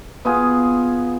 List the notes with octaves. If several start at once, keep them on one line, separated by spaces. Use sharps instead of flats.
B3 F4 G#4